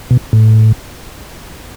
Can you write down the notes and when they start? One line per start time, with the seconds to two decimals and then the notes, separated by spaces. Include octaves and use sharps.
0.11 B2
0.33 A2